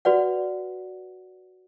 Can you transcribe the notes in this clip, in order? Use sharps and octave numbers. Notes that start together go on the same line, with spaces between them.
F#4 B4 D5 F#5